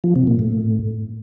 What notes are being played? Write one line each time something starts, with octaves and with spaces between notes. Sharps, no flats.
F3
C3
A#2
A2